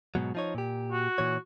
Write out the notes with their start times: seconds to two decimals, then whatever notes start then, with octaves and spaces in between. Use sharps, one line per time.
0.15 G#2 B2 F#3
0.35 F3 D#4 C#5
0.55 A#2 G4
0.92 F#4
1.18 A#2 E3 C#5